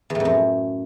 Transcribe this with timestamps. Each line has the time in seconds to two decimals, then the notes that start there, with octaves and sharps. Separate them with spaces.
0.10 E2
0.15 A2
0.20 F2
0.25 F#2